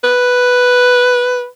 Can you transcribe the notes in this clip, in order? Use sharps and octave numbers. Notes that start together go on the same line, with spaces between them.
B4